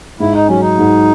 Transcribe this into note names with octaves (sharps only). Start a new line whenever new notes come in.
G#2 E4
D#4
F#3 C#4
D#4
G#2